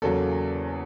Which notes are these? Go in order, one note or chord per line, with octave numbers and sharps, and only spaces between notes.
E2 C#3 F#3 A#3 A4